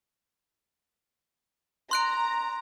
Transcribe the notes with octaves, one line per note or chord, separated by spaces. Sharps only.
A#5 C6 F#6 D7